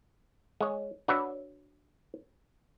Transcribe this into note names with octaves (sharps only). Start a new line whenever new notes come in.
G#3 C#5
D4 F#4 B4 C#5 D5 E5